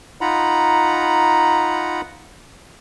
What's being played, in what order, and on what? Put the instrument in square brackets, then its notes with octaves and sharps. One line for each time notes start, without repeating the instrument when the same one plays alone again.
[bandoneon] D#4 F4 F#5 A#5 B5